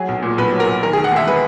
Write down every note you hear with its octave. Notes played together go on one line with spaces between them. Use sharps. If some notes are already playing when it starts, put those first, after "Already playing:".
Already playing: F#3 G#4
B1
A#2
B1 B4
F#3
A#4
B1
D#3 A#4
E1 G#4
F#5
D#2 E5
G#3 B4